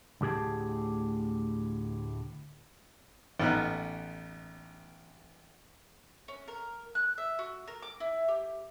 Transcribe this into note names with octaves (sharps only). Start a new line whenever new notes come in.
D2 A2 G4 G#4 A5
A1 B3 D#4 F6 F#6
C#4
A#4
F#6
E5
F#4
A#4
D6
E4
G4